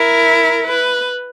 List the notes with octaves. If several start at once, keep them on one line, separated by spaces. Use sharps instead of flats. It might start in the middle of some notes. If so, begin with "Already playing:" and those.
Already playing: E4 A#4
B4